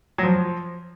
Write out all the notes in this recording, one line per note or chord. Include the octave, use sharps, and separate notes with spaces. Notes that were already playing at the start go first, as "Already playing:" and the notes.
F#3
F3